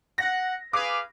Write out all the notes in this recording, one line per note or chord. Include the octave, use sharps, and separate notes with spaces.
F#5 A#6
G#4 B4 F5 D6